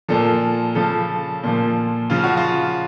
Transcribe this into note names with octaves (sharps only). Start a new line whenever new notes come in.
A#2 F3 A4
C#3 F3 A4
A#2 F3
C#3 F3 F4
F#4
F4